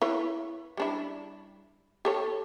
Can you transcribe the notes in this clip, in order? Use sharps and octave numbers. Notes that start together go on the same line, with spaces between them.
E4 B4 C#5
G3 D4 E4
G4 A4 C#5